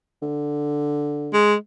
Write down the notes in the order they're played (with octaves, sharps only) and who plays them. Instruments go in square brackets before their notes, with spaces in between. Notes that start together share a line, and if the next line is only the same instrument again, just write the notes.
[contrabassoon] D3
[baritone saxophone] G#3